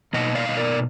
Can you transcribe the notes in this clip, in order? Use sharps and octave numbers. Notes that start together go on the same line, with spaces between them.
B2 A#3 D#4 D#5 F#5
D5 F5
D#5
A#4 D5